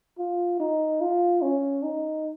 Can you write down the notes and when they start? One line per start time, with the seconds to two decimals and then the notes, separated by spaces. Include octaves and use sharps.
0.18 F4
0.60 D#4
1.01 F4
1.42 C#4
1.83 D#4